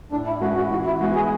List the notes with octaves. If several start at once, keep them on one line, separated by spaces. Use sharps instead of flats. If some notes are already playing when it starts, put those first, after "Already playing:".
A2 D4
E4
G#3 C#4 E4 F#4 B4
F#4
E3 F#4
E4
G#3 B3 F#4
G#4